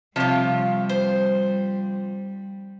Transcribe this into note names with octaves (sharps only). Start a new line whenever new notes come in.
C3 F3 G3 F4 C#5
C5